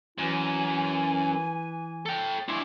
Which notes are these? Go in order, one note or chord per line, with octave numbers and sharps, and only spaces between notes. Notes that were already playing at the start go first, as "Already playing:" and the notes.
F#2 E3 E4 G#5
A4 G5
D4 E4 G#5 C6 C#6